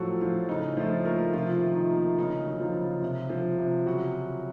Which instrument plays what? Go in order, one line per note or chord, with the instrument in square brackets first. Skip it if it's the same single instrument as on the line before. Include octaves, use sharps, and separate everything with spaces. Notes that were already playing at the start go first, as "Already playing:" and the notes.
Already playing: [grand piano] A2 F3 F#3 F#4 A4
A2 F3 F4
C#3 D#4
F3 A3 F4
A3 A#3 A#4
C3 F3 F4
D#3
D#4
A#3
C#3 D#4
F#3 D#4
F3 F4
C#3
C3
F3
C3
C#3 F#3 F#4